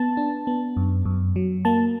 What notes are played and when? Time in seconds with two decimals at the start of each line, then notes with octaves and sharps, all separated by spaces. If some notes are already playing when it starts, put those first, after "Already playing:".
Already playing: B3 A5
0.17 D4
0.47 B3
0.77 F#2
1.05 F#2
1.36 F#3
1.65 A#3 A5